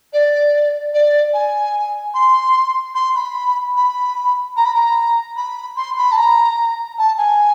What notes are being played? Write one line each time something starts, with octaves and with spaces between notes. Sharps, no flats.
D5
D5
G#5
C6
C6
B5
B5
A#5
B5
A#5
B5
C6
B5
A5
A#5
A5
G#5